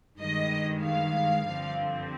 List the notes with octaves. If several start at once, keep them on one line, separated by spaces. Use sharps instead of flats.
G2 D#3 G#3 D#5
F5
G2 D3 F3 C4